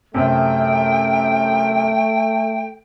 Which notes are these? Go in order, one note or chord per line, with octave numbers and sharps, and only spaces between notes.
F#2 C3 A3 G5